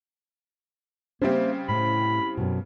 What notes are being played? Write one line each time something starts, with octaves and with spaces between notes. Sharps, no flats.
C#3 G3 A#3 C4 C5 E5
A2 B5
F#2 B2